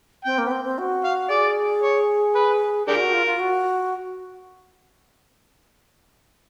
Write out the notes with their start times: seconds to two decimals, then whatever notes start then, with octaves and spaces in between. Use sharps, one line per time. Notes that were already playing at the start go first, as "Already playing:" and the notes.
0.25 C4 G5
0.38 A#3
0.47 B3
0.51 C4
0.64 C4
0.78 F#4
1.04 F5
1.30 G#4 D5
1.82 C#5
2.35 B4
2.87 D4 G4 G#4 A#4
2.95 F4
3.00 F#4
3.13 F4
3.26 F4
3.39 F#4